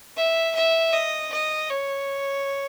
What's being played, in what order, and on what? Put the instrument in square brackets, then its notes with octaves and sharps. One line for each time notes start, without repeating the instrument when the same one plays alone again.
[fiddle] E5
E5
D#5
D#5
C#5